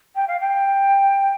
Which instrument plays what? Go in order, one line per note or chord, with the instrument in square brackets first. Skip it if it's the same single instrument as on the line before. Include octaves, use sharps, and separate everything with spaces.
[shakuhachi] G5
F5
G5